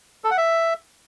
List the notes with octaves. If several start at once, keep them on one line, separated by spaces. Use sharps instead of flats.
A4
F#5
E5